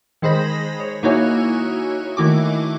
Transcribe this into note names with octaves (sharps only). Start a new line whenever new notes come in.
D#3 G#3 G#4 C5 B5 A#6
C#5
A#3 D#4 E4 F#4 C#5 G#5
D#3 A3 E4 F#4 G#5 D6